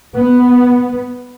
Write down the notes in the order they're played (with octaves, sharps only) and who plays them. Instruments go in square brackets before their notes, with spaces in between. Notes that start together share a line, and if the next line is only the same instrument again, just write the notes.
[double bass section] B3